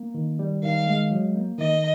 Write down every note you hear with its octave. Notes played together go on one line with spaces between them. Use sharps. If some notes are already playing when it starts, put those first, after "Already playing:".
Already playing: A#3
D#3
G3
D#3 F5
G#3
F#3
A#3
D#3 D#5